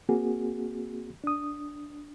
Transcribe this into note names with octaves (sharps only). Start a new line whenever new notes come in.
A#3 C4 F#4 G#4
D4 D#6